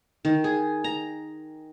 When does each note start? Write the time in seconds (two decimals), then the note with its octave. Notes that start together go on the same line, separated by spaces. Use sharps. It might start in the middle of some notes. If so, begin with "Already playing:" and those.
0.25 D#3
0.44 G#4
0.84 A#5